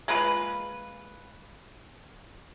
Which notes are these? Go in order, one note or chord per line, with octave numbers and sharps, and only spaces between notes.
G#3 A#3 F4 B4